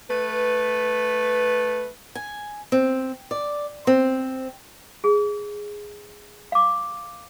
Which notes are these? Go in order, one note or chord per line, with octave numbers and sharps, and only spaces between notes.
A3 B4
G#5
C4
D5
C4
G#4
F5 D6